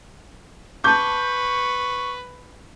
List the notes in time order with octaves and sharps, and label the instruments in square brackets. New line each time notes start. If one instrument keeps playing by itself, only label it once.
[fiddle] B4 [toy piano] A5 D6 [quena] C#6 [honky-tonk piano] G6